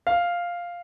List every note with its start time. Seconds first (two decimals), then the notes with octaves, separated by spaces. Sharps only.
0.07 F5